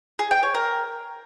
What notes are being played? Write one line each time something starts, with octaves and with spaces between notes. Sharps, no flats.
G#4
G5
C#5
A#4